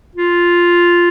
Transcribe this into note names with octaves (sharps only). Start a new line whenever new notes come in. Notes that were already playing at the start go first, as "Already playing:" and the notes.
F4